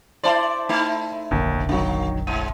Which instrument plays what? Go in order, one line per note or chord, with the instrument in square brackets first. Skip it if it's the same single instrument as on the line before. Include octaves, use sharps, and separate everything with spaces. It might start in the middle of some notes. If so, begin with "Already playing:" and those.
[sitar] E4 C5 D5 [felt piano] A5 C6
[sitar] A3 D#4 E4
[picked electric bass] F1 A#1 D3 [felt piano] D#2
[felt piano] D#3 F#3 [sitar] A#3 F#4
[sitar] G#2 [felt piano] D#7